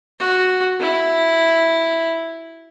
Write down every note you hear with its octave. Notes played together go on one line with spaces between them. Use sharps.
F#4
E4